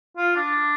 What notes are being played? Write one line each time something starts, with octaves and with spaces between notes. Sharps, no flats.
F4
D4